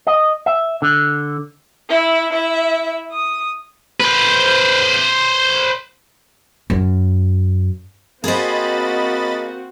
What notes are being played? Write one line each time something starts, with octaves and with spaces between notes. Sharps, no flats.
D#5
E5
D3
E4 E5
E4 E5
D#6
B4 C5
F#2
A#3 C4 F#4 G#4 C5 D#5 B5 A6